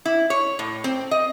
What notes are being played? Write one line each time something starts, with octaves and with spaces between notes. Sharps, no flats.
E4
C#5
A2
C4
D#5